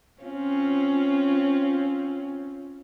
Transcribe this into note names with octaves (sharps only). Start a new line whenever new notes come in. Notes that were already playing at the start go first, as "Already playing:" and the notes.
C4 C#4 F4